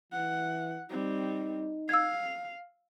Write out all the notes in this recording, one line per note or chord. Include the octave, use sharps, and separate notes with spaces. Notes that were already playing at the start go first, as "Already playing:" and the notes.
E3 F#5
G3 C4 D#4
F5 E6 G#6